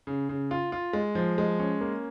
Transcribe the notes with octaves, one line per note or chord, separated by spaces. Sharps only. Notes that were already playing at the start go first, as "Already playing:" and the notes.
C#3
C#3
F4
F4
G#3
F3
G#3
C#4
A#3